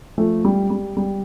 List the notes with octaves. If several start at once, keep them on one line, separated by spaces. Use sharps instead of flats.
F3 A3
G3
G3
G3